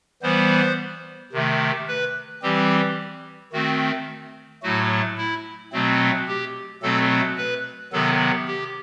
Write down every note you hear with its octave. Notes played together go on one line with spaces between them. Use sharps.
E3 G3 B3 C5
C3 D#3 A3
B4
E3 G3 C4 G4
D#3 A3 C4 F#4
A2 F#3 A3 F#4
E4
B2 F#3 A3 C4
G4
B2 F#3 A3 C4 A4
B4
C3 D#3 F#3 B3 A4
G4